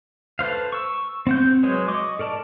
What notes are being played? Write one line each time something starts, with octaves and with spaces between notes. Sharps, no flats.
A4 B4 C5 F5
C#6 E6
C4 F#5 G6
F#3 G#3 B4 C#5
D#5 C#6 D6
A4 A#4 D5 A5